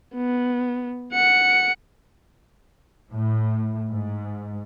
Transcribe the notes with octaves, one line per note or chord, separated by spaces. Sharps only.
B3
F#5 C#7
A2
G#2